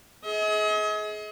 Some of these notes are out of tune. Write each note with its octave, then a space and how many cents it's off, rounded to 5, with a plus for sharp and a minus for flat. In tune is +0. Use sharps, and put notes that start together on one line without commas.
G#4 +25 D#5 +40